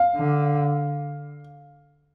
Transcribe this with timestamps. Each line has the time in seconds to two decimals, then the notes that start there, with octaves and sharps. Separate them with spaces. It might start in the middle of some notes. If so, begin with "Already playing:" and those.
Already playing: F5
0.16 D3